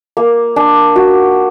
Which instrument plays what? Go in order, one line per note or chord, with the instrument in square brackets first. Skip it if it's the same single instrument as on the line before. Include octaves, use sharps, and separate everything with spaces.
[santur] A#3
D4
F#4